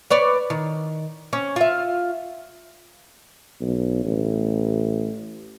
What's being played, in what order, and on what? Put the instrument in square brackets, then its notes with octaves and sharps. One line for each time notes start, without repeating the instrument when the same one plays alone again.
[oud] B4 C#5 D5
D#3
C#4
F4 E5
[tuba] B1
A1